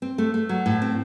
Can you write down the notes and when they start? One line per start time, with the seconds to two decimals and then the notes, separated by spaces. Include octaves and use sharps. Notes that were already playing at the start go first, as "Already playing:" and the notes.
0.02 C4
0.18 A3
0.34 A3
0.49 F#3
0.66 A2
0.82 C4